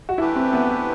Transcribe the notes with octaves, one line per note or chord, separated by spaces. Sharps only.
F#4
E3 A3 D4 E4 G4 B4
C4
B3